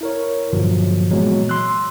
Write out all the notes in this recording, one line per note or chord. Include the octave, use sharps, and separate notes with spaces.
E4 A#4 C#5
G2 A#2 D3 F3 F#3
A#2 E3 F#3 G#3 B3
C6 E6 F#6